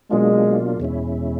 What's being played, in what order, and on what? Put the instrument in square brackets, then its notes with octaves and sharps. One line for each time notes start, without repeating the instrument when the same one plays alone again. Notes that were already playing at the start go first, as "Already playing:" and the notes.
[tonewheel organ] B2 F#3 A#3 D4 F4 [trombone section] G#3
[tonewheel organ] E2 B2 G#3 C#4 E4